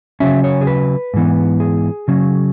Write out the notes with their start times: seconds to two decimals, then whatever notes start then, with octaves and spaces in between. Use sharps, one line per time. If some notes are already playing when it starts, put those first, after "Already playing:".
0.20 C#3 F#3 C#4 E5
0.44 C#5
0.61 G#4
0.67 B4
1.14 G#2 E3 B3
1.60 G#4
2.08 C#3 F#3 C#4